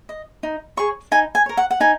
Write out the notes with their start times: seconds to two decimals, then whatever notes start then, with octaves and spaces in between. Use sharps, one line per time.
0.09 D#5
0.43 D#4
0.77 G#4 C#5 C#6
1.12 D#4 G#5
1.35 G#5
1.46 A#4 C#5
1.57 F#5
1.71 F#5
1.80 D#4 G#5